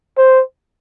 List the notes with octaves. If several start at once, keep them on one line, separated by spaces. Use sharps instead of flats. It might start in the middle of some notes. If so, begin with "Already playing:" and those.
C5